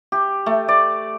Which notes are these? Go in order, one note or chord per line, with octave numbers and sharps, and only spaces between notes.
G4
A3
D5